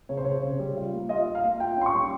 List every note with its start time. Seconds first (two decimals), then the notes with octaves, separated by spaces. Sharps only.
0.09 C#3 C#5
0.17 C5
0.25 C#3 C#5
0.43 C#3
0.59 G3
0.77 F4
0.93 A#3
1.09 F4 D#5
1.26 F4
1.35 F5
1.44 A#3
1.60 F4 G5
1.77 C#4 C6
1.86 C#6
1.94 G3